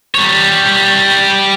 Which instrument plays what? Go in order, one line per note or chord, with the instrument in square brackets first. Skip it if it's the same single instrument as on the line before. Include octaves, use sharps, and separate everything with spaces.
[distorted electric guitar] G3 C#5